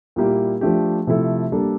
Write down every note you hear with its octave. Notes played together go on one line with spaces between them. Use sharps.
A#2 G3 A#3 E4 G4
F3 A3 D4 G4
C3 F3 A3 E4 A4
G3 A#3 D4 A4